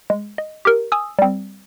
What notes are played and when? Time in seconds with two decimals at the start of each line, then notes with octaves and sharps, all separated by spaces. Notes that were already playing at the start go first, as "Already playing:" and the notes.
0.10 G#3
0.38 D#5
0.65 G4 A#4
0.92 G#5 D#6 E6
1.19 G3 C4